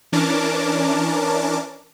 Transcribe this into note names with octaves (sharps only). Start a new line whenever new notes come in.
E3 C#4 D4 A#4 A5 D6